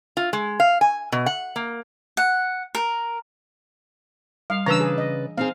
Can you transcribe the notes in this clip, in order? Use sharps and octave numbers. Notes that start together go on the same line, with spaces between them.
F4
G#3
F5
G#5
B2
F#5
A#3
F#5
A#4
G3 F5
C#3 E3 D4 B4 D5 A#5 E6
G#4
D#5
C4 D#4 G#4 F5